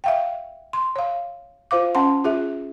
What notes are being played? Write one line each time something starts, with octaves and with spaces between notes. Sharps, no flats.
E5 F5 G5
C6
C#5 F5
F4 C5 F5 D6
C#4 F#5 A5 C6
F4 G#4 E5